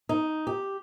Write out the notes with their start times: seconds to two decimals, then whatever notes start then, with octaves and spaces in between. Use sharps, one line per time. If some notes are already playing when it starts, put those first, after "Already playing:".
0.09 D#4
0.47 G4